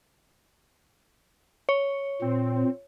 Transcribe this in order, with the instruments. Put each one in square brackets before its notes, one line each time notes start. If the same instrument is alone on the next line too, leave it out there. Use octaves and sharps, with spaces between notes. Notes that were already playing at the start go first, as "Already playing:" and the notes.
[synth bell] C#5
[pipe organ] A#2 [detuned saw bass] C4